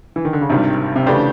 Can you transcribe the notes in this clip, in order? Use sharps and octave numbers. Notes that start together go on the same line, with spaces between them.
E3
D#3
D3
C#3
G#1 G2 C3 D#3 G3
C3
C#3 E3 A3 D4 G4 C5